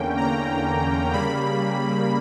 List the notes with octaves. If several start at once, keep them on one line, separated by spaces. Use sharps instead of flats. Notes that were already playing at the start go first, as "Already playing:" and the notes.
Already playing: E2 D3 A#3 C#4 G5
A#5
C#3 G3 A#3 B5